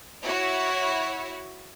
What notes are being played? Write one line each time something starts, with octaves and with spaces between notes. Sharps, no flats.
E4 F#4 C#5